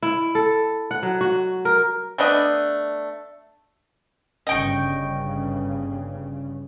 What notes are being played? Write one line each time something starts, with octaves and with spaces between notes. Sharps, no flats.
E4
A4
F#5
F#3
F#4
A#4
A3 B3 D4 D#5
G1 C#3 D#5 G5 C#6